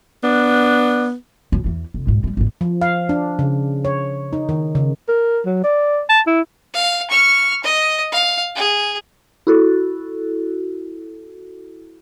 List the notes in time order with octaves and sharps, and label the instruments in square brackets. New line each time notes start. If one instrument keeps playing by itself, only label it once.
[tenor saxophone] B3 [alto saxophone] D4
[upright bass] F#2
E2 E3
F1
B1 G#2
D#3 G3
G#1 A2
[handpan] F3
F5
D4
C#3
C#5
D#4
D#3
C#3
[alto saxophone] A#4
F#3
D5
A5
E4
[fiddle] F5
C#6 F6
D#5
F5
G#4
[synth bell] E4 F#4 A4